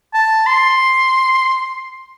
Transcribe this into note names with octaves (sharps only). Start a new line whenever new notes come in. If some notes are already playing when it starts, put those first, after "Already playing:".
A5
C6